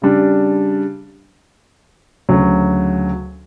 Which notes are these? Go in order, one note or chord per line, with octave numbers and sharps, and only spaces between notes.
C#3 G3 D4
D2 C#3 F#3